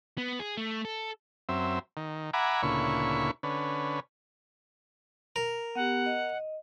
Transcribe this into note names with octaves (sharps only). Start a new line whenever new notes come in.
B3
G#4
A3
A4
F#2 C4 E5
D#3
E5 F#5 G#5 A#5 B5 D6
D2 A#2 C#3 E4 B5 C#6
D3 C#4 B4
A#4
B3 G4 F#5
D#5